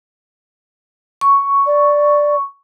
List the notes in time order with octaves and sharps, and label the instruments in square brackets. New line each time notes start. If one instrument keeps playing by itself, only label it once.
[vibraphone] C#6
[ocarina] D5